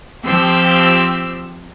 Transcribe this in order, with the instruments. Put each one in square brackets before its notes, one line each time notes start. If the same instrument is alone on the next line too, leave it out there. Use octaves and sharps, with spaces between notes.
[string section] F3 C4 G4 E6